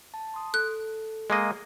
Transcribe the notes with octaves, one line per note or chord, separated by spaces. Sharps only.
A5
C6 D#6
A4 F#6
G#3 A#3 D#5